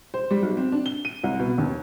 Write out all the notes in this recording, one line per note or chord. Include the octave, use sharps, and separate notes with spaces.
C5
G3
B1
C4
D4
G7
D#7
C2
B2
D#2